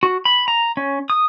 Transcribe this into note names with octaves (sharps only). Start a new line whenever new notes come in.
F#4
B5
A#5
C#4
D#6